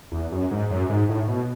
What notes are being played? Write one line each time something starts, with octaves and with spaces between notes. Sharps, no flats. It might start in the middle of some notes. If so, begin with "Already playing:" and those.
E2
F#2
G#2
F#2
G#2
A2
B2